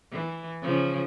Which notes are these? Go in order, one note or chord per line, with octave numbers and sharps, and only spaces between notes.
E3
C#3 F3